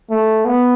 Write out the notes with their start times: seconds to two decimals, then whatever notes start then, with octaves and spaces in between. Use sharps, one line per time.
0.11 A3
0.45 B3